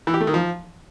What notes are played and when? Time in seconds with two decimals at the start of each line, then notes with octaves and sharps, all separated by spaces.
0.07 E3
0.14 G4
0.20 A3
0.27 D#3
0.34 F3